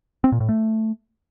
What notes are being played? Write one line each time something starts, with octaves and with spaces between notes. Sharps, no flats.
C4
A#2
A2
A3